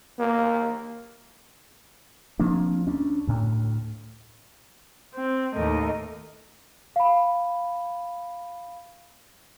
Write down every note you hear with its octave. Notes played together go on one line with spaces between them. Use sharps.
A#3
F3 A#3 C4 D4
D2 C#4 D4
D2 A2
C4
D#2 A2 A3 A#4 D#5
F5 B5